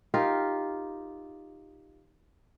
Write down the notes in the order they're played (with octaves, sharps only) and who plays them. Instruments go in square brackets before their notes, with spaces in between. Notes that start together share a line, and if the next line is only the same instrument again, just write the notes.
[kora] D#4 F4 G4 A#4